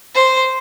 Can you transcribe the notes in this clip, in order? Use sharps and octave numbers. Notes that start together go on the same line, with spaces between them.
C5